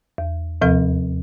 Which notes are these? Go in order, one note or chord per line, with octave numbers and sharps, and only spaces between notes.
E2
D#2 C3 F3 C4 A4 F5